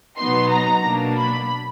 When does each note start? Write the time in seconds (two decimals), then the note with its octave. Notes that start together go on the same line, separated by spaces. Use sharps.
0.18 B2 F#3 B3 D#4 C6
0.51 A#5
0.84 B2 F#3 A#3 D4
1.17 B5